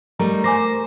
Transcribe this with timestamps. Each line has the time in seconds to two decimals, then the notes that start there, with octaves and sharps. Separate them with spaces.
0.19 G3 A3 D#4 A#4 A#5
0.44 C5 G#5 D6 A#6